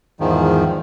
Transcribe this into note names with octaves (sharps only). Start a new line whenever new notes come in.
E2 G#2 D#3 F3